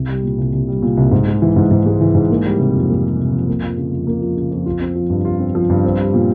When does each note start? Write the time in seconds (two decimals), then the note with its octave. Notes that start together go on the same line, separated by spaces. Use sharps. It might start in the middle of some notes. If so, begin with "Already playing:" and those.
Already playing: C2
0.09 G3
0.24 A#2
0.38 C2
0.53 C2
0.68 G3
0.82 A#2
0.97 C2
1.11 G#2
1.27 G#3
1.42 E3
1.56 G#2
1.71 G#2
1.86 G#3
2.01 E3
2.15 G#2
2.30 A#3
2.45 G3
2.59 C3
2.74 F2
2.89 A#3
3.04 G3
3.19 C3
3.33 F2
3.48 A#3
3.63 F3
3.78 C#3
3.92 F2
4.07 A#3
4.22 F3
4.37 C#3
4.51 F2
4.66 F4
4.81 C4
4.95 F3
5.10 G2
5.25 F4
5.40 C4
5.55 F3
5.70 G2
5.84 C4
5.99 G3
6.14 A#2